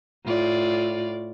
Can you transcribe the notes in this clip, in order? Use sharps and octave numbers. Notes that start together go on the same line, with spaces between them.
A2 F4 D5